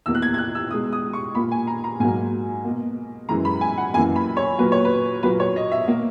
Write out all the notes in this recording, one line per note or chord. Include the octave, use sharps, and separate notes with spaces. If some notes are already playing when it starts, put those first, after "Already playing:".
E2 B2 A#3 E6
F#6
G#6
G#6
F#6
E6
B2 G#3 D#6
D#6
C#6
A#2 A#3 B5
G#5
A#5
A#5
G#2 F#3 A#3 G#5
B2 A#3
F#2 E3 G#3 A#5
B5
G#5
F#5
F#2 E3 A#3 G#5
B5
C#5
A#2 F#3 A#3 B4
C#5
B4
A#2 F#3 A#3 B4
C#5
D#5
E5
B2 A#3